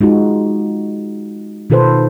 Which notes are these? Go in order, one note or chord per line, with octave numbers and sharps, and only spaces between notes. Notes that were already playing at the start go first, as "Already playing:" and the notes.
G#3 D#4 F4 F#4
B2 D#3 F4 A4 B4 C5